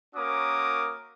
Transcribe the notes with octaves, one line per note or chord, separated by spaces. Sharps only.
A#3 C#4 F#4 A#4 D6 D#6